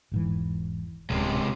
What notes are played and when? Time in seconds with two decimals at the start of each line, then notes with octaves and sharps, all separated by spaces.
0.12 E1 G#2 E3
1.10 D1 C#2 C3